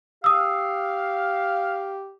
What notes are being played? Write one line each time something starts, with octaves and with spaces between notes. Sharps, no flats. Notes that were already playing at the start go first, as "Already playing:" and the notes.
G4 F5 D#6 E6